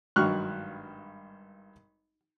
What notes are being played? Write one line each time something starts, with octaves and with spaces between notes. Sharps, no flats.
G#1 G2 F#3 C#6 F6 F#6